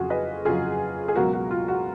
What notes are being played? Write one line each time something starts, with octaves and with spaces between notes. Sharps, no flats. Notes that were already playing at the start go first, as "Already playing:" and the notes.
Already playing: F2 C#3 F#3 F4 F#4 G#4
B4 D#5
F2 C#3 F#3 F4 G#4
G#4
C#2 B2 F#3 F#4 A#4
F#4
F4
F#4